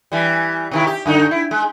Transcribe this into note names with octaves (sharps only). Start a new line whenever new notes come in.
E3 G3
C3 D#3 E4
G4
F#2 D3 D#4
E4
G#3